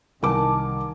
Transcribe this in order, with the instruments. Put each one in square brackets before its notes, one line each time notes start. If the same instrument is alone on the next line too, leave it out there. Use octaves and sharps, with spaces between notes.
[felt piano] C2 A#4 D6 [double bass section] D#3 [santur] G#5 A5